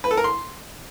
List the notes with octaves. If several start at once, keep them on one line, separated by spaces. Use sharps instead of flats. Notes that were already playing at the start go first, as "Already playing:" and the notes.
B4
A4
A#4
C6